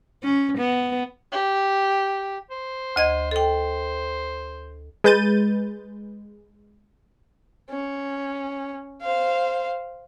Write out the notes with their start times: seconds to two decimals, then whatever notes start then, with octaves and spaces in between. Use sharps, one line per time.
0.23 C#4
0.58 B3
1.32 G4
2.51 C5
2.96 D2 D#5 G#6
3.31 A4 C5 G5
5.04 G#3 B4 G6 A6 D#7
7.70 C#4
9.01 C5 F5